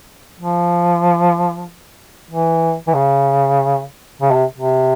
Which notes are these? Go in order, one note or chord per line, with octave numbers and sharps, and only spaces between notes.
F3
E3
E3
C#3
C#3
C3
C3